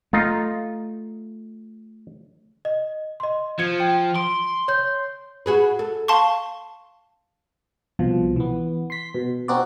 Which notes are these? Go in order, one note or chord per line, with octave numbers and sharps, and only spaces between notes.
A3 D#4 F4
D#5
D#5 C6
F3 G#6 C#7
G5
C6 D7
C#5 G6
F#4 G#4 B4
A4
F5 A5 C6 C#6
C2 B2 F3
E3 B3
C6 B6
B2
C4 C#4 D#4 F#4 C5 D5